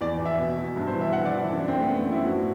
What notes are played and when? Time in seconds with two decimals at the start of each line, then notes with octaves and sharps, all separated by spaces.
0.01 E2 D5
0.20 E2
0.25 E5
0.38 B2
0.57 B2
0.76 G2
0.87 C5
0.94 E3
1.01 E5
1.12 E3 F#5
1.25 D5
1.31 E3
1.37 E4
1.50 F#2 E4
1.59 D4
1.68 F#2 C4
1.78 A3
1.87 F#2 B3
1.99 C4
2.06 F#2
2.12 E4
2.25 A2 F#4